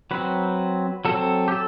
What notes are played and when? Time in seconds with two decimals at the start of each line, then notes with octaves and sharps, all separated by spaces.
0.11 F#3 C4 B4
1.05 F#3 C4 A4
1.48 G4
1.52 A4